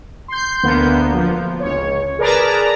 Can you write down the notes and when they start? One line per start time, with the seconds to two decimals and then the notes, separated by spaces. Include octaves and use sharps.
0.28 C6 G6
0.63 D2 D3 A#3 B3
1.14 F3
1.60 C#2 C#5
2.19 G#4 A#4 B4 D5 A5 A#5